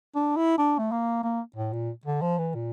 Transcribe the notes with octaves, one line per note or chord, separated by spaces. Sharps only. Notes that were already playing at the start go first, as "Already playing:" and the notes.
D4
E4
D4
A3
A#3
A#3
A2
A#2
D3
F3
E3
A#2